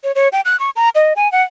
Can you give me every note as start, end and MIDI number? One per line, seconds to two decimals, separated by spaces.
0.04 0.12 73
0.15 0.29 73
0.33 0.41 79
0.45 0.59 90
0.60 0.70 85
0.76 0.89 82
0.95 1.13 75
1.16 1.31 80
1.32 1.43 78